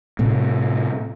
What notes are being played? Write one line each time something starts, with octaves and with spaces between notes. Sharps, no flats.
A2 C3